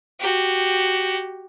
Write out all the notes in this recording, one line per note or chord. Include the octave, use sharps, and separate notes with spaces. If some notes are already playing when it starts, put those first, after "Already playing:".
F#4 G4